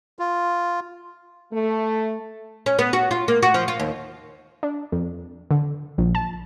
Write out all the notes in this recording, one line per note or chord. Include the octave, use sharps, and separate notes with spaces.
F4
A3
C#4
B3
F#4
F4
A#3
F#4
F3
F4
D#2
D4
F2
D3
A#1
A5